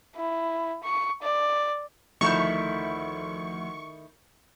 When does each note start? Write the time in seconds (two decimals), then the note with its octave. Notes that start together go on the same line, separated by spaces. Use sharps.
0.16 E4
0.83 C#6
1.22 D5
2.21 D2 D#3 F3 A3 E4 C#6 G6